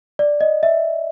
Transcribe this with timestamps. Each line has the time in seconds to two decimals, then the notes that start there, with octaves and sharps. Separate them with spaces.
0.19 D5
0.41 D#5
0.63 E5